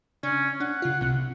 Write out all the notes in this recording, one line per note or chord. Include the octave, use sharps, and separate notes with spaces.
C#3 C#4 D4
D4 F#5
C#3 F4
C2 C3